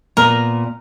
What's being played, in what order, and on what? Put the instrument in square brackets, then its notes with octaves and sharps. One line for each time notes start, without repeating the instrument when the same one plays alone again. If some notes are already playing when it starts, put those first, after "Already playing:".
[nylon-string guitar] A#2 B3 [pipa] A#4